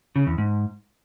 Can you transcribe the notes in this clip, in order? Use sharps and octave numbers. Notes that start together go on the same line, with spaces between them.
C#3
E2
G#2